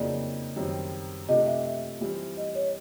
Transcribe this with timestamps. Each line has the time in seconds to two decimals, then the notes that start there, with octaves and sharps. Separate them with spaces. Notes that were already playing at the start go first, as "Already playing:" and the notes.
Already playing: F2 C#3 F#3 A#3 D#4 D5
0.56 F#2 D#3 G3 C4
1.28 C3 F3 A3 D4 D#5
1.47 E5
1.65 E5
2.01 E3 G3 C4 F4
2.37 D#5
2.55 C#5